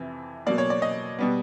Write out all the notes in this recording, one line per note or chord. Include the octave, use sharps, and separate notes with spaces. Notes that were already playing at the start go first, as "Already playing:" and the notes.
Already playing: F2 C3 E3
B2 F#3 A#3 D5
C#5
D5
D#5
B2 G3 B3